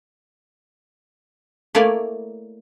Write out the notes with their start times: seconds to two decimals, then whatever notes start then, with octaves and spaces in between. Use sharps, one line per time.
1.75 A3 A#3 E4 C#5 D5 G#5